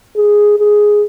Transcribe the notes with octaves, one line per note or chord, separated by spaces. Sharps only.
G#4
G#4